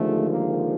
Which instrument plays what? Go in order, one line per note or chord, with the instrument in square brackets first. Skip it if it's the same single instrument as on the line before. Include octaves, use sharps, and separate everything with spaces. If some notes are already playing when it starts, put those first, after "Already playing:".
Already playing: [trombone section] D#2 D3 F3 G#3 A3
A#3